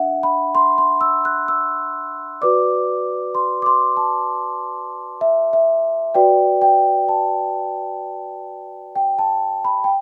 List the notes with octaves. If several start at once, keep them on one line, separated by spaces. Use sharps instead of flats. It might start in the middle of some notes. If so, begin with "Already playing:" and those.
Already playing: D4 E5 F#5
B5
C6
C6
E6
F#6
E6
F#4 B4 D5 D6
C6
D6
C6
A5
E5
E5
F#4 B4 D5 G5
G5
A5
G5
A5
B5
G5